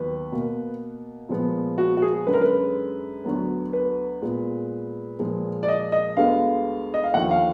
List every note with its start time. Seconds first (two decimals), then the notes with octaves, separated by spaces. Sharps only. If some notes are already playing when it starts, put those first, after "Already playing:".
Already playing: D#2 D#3 F#3 B3 B4
0.32 B2 A#3
1.29 A#2 F3 G#3 B3
1.78 F#4
1.97 F#4
2.02 G#4
2.27 F#2 D3 G#3 B4
2.34 A#4
2.41 B4
3.25 D2 D3 F#3 B3
3.73 B4
4.22 A#2 G#3 B3
5.19 A#2 F3 G#3
5.63 D5
5.68 D#5
5.92 D#5
6.17 D2 D3 G#3 B3 F5
6.94 D#5
7.04 F5
7.14 D#2 D3 F3 F#5
7.31 F5